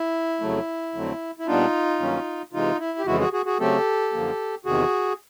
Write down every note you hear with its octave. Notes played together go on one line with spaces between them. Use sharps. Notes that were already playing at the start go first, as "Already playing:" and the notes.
Already playing: E4
F2 C#3 F#3 A3
F2 D3 F#3 A3 C4
E4
A#2 G3 B3 D4 D#4 F4
G2 D#3 F#3 A#3 C#4
C3 E3 G#3 D#4 F4
E4
G4
F2 C#3 E3 G#3 E4 F#4
F#4 G#4
F#4 G#4
F#4 G#4
C#3 F#3 A3 C4 G4 A4
F#2 D3 F3 A#3
E2 C3 D#3 F#4 G#4